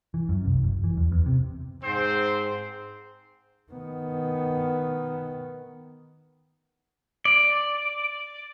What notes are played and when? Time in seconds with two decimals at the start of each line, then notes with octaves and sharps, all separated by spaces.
0.14 E3
0.29 F#2
0.45 C2
0.63 F#1
0.84 E3
0.97 E2
1.12 E2
1.26 C3
1.83 G#2 C4 C5
3.72 D#3 B3
7.25 D5